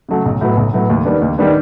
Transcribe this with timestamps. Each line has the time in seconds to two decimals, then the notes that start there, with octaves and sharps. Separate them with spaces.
0.09 C#3 F#3 A3
0.26 B1
0.41 A2 F#3 B3
0.57 B1
0.74 A2 F#3 B3
0.90 D#2
1.05 D#3 G3 B3 D4
1.22 D#2
1.38 D#3 G3 B3 D4